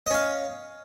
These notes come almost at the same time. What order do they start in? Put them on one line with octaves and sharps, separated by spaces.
D#5 C#4 F5